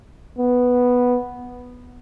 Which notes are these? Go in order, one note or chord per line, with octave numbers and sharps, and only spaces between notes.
B3